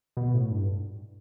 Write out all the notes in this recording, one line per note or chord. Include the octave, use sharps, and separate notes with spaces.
B2
A2
G2